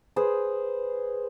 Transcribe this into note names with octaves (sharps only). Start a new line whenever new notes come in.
G#4 B4 C5